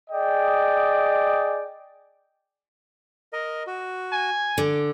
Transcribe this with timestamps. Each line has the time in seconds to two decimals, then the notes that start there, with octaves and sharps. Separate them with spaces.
0.10 G#4 D5 D#5 G5
3.33 A#4 D#5
3.67 F#4
4.13 G#5
4.58 D3 D6